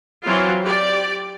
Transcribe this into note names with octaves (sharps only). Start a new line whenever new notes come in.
E3 F#3 C4 E4 F4
G4 D5